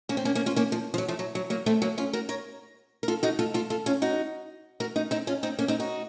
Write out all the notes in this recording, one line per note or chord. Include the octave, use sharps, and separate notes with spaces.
A#3 C#4
C4
A#3 C#4
A#3 C#4
C#4 F4
A#3 C#4
F3
F3
F#3
F3 A3
F#3
F#3
F#3 A#3
A3 C4
F#3 A#3
C#4 F4
F#4 A#4
A#4 C#5
A#4
F4 A4
D#4 F#4
F4 A4
F4 A4
F4 A4
C#4 F4
D#4 F#4
F#4 A#4
D#4 F#4
C4 D#4
C#4 F4
C4 D#4
A#3 C#4
C4 D#4
D#4 F#4